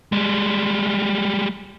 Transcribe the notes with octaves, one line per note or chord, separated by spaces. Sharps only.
G3 G#3